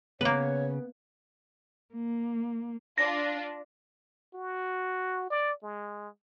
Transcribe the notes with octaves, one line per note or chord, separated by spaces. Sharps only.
C#3 A#3 B3 B4 C#5
A#3
D4 F4 A#6
F#4
D5
G#3